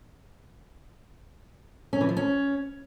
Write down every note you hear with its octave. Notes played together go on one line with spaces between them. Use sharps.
C#4
E3
F3
C#4